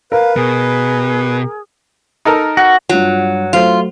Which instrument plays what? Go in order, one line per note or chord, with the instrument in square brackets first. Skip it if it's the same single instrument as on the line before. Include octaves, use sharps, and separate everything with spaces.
[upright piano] A#4 [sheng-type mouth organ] B4 [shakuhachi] F5
[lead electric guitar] B2 [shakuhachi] G#4
[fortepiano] D#4 A4 A#4
[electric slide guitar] F#4
[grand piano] G2 F4 [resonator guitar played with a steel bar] F#3
[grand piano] F#3 A3 C5 [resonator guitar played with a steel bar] F4